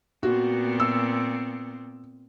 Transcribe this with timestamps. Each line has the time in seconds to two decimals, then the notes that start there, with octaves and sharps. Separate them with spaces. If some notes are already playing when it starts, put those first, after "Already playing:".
0.23 A#2 B3 C4 F#4
0.80 E6